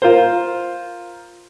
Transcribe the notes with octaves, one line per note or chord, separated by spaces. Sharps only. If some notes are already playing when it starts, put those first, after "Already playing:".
F4 A#4 C5